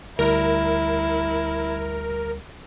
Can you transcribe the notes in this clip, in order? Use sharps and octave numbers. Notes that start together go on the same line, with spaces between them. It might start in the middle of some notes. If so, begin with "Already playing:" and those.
D2 G3 E4 A#4